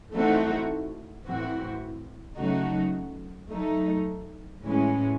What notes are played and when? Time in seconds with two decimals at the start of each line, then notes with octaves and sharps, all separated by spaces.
0.12 E3 A3 C4 D#4 F#4
1.25 A2 E3 C4 F#4
2.37 C#3 F#3 A3 D#4 F#4
3.50 F#3 A3 D#4
4.62 A2 E3 G#3 C#4